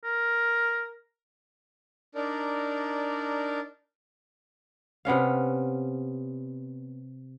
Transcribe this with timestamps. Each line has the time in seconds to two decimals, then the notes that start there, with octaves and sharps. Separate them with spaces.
0.04 A#4
2.15 D4 D#4 A#4 D5
5.05 C3 B3 C#4 F5